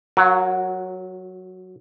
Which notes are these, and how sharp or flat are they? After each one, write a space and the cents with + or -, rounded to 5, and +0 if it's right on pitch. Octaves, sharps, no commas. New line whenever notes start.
F#3 +0 F#4 -45 A#4 +0